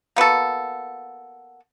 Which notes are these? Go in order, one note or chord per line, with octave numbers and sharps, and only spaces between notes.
A#3 B3 F#4 A4